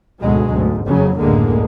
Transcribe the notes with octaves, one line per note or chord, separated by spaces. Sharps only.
D2 G#2 B2 F#3 G#3
D2 G#2
F#1 F2 C#3 F#3
F#1 D2 A2 D3 G#3 A#3